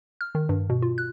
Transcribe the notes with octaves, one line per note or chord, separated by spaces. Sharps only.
F6
D#3
G2
B2
F4
F#6